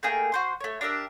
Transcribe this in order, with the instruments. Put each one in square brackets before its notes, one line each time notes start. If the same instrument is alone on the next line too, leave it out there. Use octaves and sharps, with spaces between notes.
[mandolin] A3 A#3 G#4 G5
F#4 C5 C6
A3 C#5
D4 G4 A#4 E5